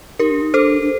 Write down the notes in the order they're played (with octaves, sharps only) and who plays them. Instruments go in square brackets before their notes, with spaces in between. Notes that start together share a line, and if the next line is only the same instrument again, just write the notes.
[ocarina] D#4 [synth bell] G4 A#4
[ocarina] D4
D#4
[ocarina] D4 [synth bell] A4 C5
[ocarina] D4